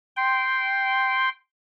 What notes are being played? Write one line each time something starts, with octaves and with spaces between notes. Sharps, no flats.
G5 C6